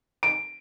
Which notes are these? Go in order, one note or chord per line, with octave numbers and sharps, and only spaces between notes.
D7